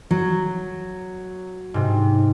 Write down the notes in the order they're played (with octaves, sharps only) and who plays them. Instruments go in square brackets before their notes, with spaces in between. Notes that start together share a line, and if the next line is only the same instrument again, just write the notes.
[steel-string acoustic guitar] F#3
[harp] G#2 C3